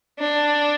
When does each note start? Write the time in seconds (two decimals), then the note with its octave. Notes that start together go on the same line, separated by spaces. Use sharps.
0.19 D4